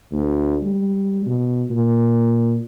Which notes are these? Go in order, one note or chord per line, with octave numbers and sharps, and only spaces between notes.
D2
G3
B2
A#2